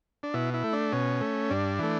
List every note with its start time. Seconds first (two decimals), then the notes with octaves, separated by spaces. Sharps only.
0.23 D4
0.34 B2 E4
0.54 E4
0.64 A3
0.73 D4
0.92 B2 C#4
1.21 A3
1.50 G2 D4
1.79 E3 A3